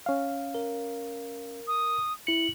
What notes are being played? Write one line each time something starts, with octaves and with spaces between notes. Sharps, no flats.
C#4 F5
A#4
D#6
E4 C#7 F#7